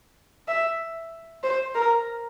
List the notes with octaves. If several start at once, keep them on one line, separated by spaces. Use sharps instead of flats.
E5
C5
A#4